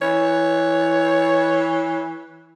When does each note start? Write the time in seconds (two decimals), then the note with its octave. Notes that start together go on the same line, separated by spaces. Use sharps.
0.02 E3 C#5